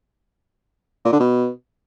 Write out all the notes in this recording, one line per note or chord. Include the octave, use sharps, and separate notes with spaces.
A#2
D3
B2